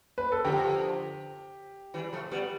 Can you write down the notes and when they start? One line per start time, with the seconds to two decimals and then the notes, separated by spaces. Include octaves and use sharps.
0.18 B4
0.32 A4
0.44 D3 F3 G4
1.94 E3 G3
2.13 F3 A3
2.31 G3 B3